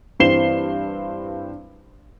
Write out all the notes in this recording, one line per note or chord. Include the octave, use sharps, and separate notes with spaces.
G2 E3 C4 C7 E7 G7